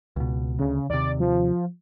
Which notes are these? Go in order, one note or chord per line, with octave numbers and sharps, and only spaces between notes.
C#2 B2
D2 C#3
D#2 C3 D5
F3